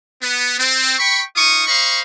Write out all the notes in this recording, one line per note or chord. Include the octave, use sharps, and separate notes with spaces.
B3
C4
G5 B5 C#6
D#4 F4 C#6 D#6
C5 D#5 F5 B5 C#6